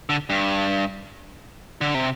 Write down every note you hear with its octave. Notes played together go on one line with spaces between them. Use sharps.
D3
G2
D3
C3